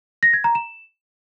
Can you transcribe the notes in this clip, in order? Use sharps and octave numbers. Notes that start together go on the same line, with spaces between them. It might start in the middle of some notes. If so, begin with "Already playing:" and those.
A#6
G#6
A#5
E7